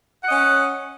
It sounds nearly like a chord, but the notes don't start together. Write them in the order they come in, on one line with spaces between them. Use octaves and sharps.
F#5 D#5 C#4